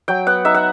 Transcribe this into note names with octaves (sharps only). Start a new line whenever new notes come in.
F#3 G5
B3 F#5
D#4 E5
F#5